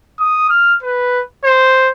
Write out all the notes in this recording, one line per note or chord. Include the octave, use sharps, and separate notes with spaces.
D#6
F6
B4
C5